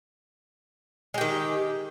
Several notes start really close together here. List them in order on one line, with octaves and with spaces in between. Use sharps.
G#3 G4 D#3